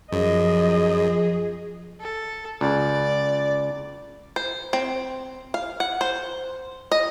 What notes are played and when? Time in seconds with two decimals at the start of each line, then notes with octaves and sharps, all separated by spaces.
0.12 F#2 F3 G#4 D#5
2.01 A4
2.61 C#2 D5
4.36 C5
4.73 C4
5.54 F5
5.80 F#5
6.01 C5
6.92 D#5